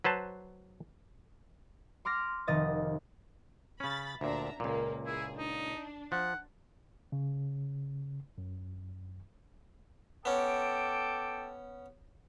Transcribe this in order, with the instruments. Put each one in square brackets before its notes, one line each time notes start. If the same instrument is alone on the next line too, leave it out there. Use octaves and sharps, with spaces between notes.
[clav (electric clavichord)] F#3 B4 C5 A5
[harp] C6 D6 F6 A#6
F1 D#3 D#5 D#6 A6
[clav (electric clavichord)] C#3 C#4 [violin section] B5 A6
[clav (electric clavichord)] D2 A#2 [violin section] D4 E5 A#5
[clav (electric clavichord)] C#2 A#2 [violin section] A#3
[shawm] E4 [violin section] G#4
[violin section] D4 [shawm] D#4
[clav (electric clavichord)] F3 [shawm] F#5
[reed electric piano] C#3
F#2
[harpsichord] B3 C#4 [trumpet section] A4 G5 D6